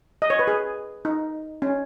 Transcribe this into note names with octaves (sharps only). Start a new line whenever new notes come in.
D#5
C#5
B4
G#4
D#4
C#4